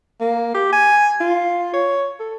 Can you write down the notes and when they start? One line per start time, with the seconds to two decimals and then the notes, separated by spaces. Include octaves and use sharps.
0.21 A#3
0.55 G4
0.73 G#5
1.20 F4
1.74 C#5
2.19 A4